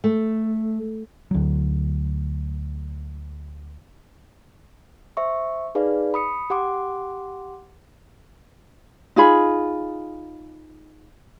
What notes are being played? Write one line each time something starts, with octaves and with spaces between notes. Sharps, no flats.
A3
D2 F#3
C5 E5 C#6
D#4 G#4 B4 D5 F5
B5 D#6 C#7
G4 F#5 C6 D6
D#4 F4 G#4 B5